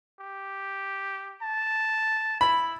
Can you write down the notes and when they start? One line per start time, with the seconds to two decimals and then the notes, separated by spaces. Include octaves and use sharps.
0.20 G4
1.42 A5
2.41 E4 B5